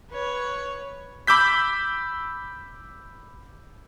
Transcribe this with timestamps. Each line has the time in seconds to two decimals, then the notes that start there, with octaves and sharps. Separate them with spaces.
0.11 B4 C#5
1.27 B5 D6 E6 G6 B6